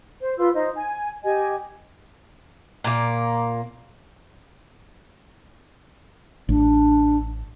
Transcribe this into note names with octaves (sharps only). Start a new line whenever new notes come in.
C5
F4 B4 C6 E6
D#4 C5 D#5
G#5
G4 D#5 G#5
A#2 A#3
A1 D4